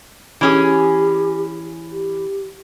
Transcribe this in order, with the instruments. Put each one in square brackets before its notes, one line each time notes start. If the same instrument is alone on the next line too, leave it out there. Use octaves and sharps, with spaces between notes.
[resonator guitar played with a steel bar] E3 C#4 G#4 [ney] G4
[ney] G4